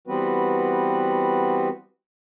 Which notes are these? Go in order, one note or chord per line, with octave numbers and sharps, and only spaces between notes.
E3 G3 B3 C4 F#4 B4